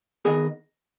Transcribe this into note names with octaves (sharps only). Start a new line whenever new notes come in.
D#3 B3 G#4 D#5